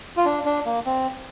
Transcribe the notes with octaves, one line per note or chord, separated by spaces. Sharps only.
F4
D4
D4
A#3
C4